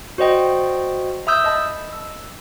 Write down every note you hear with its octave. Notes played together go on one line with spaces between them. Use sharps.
F#4 C5 D5 D#5 G5
E5 B5 D#6 E6 G6
D#5 A5 B5
E6